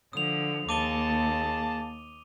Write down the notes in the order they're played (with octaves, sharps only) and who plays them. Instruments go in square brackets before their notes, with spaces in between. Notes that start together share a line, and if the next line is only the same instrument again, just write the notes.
[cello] D3 F3 [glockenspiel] D#6 F7
[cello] D#2 [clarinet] A#3 [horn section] G#4 A5 [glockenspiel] D6 D#7 G7